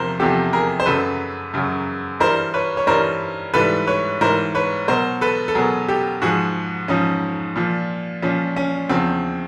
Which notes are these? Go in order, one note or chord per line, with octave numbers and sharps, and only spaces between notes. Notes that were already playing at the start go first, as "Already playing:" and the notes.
Already playing: E2 C3 F3 A#4 C5
E2 C3 F3 G4 A4
G#4 A#4
C5
F#2 C#3 F#3 A4 B4
F#2 C#3 F#3
G2 E3 G3 A#4 C5
B4 C#5
C#5
G2 E3 G3 A#4 C5
G#2 E3 G3 A4 B4
B4 C#5
G#2 E3 G3 A#4 C5
B4 C#5
B2 F#3 A#4 C5
A4 B4
A4
B2 F#3 G#4 A#4
G4 A4
G#2 F3 F#4 G#4
G#2 F3 C#4 D#4
A#2 F3
A#2 F3 C#4
C#4
E2 C#3 F3 C4